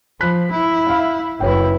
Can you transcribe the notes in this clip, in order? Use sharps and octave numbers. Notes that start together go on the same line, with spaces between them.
F3 B5 F#6 B6
E4
E5 F5 B5
F#1 E4 B4 C#5 G5